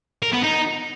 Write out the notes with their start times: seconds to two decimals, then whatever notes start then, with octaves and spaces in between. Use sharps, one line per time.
0.22 A#4
0.33 B3
0.43 D#4